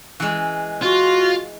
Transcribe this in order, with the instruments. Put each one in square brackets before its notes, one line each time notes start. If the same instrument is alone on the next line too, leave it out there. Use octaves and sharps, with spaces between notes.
[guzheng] E3 G#3
[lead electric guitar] F4 [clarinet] F#4